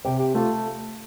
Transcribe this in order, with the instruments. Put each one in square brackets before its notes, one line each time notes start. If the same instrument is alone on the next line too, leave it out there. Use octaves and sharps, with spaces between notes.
[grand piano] C3 [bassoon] G4
[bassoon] G4
[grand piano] A3 [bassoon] F4